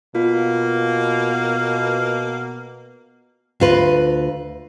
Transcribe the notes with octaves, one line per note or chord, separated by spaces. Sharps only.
B2 A#3 F4
D2 F4 B4